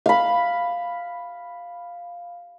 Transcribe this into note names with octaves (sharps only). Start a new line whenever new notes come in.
F5 B5